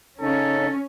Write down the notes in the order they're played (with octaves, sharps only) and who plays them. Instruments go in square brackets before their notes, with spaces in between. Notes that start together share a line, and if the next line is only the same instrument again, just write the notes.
[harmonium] C#3 D#4 [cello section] C#4 [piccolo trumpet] A4